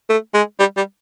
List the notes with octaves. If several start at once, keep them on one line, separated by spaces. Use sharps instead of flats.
A3
G#3
G3
G3